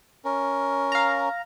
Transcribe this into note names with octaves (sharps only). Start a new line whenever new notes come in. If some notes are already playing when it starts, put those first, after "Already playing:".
C#4 A#4
F5 A#5